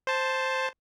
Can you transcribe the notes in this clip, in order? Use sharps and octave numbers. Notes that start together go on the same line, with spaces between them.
C5 A5